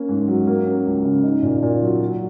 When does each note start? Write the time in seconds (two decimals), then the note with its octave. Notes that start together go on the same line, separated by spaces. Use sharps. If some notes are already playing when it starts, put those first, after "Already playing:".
Already playing: A#3 C#4
0.09 G#2
0.28 F#3
0.47 A#3
0.66 C#4
0.86 C#2
1.05 C#3
1.24 D#4
1.43 A#2
1.62 A#2
1.82 F#3
2.01 F#3